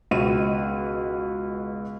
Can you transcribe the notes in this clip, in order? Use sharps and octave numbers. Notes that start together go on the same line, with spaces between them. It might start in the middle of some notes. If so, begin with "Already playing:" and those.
C#2 B2 D#7